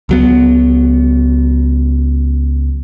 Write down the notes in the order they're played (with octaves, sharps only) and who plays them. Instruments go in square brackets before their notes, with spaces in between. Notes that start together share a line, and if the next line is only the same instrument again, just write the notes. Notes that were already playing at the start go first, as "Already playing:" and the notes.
[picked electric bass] C#2 F#3 B3